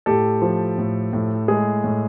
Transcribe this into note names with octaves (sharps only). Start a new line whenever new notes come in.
A2 G4 A4
F3
A2
A2
G#3 G#4
A2